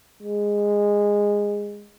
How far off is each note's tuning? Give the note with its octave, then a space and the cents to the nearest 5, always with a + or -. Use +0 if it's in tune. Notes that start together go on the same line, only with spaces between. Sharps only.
G#3 -15